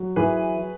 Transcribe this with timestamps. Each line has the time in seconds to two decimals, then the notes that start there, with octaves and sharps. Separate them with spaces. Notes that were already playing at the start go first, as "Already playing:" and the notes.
Already playing: F#3
0.16 E3 G#4 B4